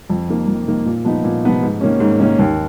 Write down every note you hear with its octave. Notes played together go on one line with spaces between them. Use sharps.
F2
D#3 A#3
F2
D#3 A#3
A#2
F3 B3 D#4
A#2
F3 B3 D#4
G#2
D#3 A#3 C#4
G#2
D#3 A#3 C#4
D#2